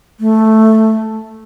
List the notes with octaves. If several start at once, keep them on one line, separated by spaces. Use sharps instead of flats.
A3